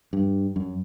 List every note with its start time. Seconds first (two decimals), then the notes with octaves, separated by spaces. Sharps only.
0.13 G2
0.56 F#2